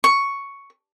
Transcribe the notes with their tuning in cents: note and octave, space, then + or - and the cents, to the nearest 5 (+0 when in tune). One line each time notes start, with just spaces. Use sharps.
C#6 +5